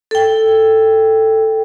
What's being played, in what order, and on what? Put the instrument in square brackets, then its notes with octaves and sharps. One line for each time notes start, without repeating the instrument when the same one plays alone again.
[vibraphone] A4 G5